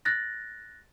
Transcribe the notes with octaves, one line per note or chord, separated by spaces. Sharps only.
F#6 A6 A#6